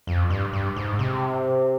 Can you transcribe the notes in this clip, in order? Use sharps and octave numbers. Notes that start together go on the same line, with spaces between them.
F2
G2
G2
G#2
C3